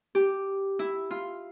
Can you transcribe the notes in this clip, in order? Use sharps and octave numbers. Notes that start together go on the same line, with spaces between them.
G4
E4
F4